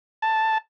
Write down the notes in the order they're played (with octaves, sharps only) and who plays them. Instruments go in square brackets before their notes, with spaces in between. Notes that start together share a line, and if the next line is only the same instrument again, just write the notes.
[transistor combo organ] A5